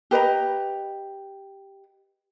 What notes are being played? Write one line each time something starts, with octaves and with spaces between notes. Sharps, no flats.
G4 B4 D#5 A#5